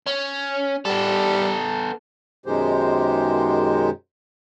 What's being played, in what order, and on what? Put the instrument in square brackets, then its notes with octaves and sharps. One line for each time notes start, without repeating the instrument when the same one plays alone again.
[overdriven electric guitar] C#4
[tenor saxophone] G3 [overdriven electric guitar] B3 A4
[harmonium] F#2 B2 D#3 G#3 G4 C5